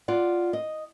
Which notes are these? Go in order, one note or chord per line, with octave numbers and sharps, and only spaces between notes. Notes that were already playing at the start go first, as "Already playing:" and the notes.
F4 D5 F#5
D#5